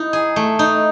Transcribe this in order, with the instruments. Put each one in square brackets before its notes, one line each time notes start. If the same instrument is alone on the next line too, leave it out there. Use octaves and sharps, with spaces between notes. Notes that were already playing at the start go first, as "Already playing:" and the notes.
Already playing: [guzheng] D#4 [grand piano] E4
[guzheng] G#4
A3
D#4